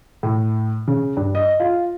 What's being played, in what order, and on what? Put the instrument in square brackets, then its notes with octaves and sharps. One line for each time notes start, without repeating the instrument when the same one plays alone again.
[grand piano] A2
C#3
G2
D#5
F4